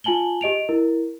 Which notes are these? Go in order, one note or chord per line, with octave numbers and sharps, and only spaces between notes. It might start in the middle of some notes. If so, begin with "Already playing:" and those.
F4 G#5 A5 F#7 G7
G4 D#5 D7 F7
E4 A#4